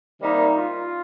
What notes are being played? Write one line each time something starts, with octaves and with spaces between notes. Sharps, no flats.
C3 D#3 G3 A#3 D#4
F4